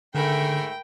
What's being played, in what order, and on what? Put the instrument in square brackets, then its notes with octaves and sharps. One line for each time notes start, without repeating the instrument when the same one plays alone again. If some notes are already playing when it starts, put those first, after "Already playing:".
[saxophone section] G#2 A3 [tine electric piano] D3 [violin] A#4 B5 [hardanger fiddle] G5